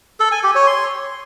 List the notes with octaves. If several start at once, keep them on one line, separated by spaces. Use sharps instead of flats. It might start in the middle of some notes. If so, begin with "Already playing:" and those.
A4
G#5
G4
C#5
C6